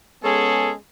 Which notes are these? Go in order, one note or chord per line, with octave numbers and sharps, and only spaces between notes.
G#3 B3 C#4 G#4 A4